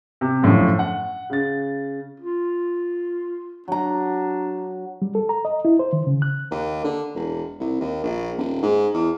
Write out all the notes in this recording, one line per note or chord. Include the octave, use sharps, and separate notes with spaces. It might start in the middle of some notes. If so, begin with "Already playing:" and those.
C3
F#2 A2 D3 F3
F#5
C#3 A6
F4
F#3 D4 A#5
G3
A4
A#5
D#5
E4
C5
D#3
C#3
F#6
D#2
D3
E1
C2
D#2
A#1
D#1
G#2
E2